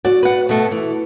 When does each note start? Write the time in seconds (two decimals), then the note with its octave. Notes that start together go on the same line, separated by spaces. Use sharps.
0.05 F#4 D5
0.23 B4 F#5
0.49 B2 A3
0.71 E3